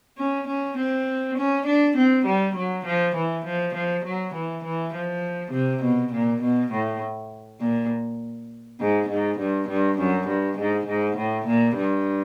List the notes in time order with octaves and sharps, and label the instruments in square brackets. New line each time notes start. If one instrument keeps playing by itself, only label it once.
[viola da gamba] C#4
C#4
C4
C#4
D4
C4
G3
F#3
F3
E3
F3
F3
F#3
E3
E3
F3
C3
B2
A#2
B2
A2
A#2
G#2
G#2
G2
G2
F#2
G2
G#2
G#2
A2
A#2
G2